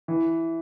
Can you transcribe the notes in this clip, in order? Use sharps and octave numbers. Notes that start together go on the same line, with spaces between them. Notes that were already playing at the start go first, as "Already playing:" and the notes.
E3